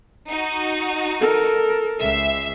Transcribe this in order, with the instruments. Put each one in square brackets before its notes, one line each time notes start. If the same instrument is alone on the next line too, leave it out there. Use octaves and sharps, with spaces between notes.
[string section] D#4 F#4
[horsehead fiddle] A4 A#4
[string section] C#2 E5 C7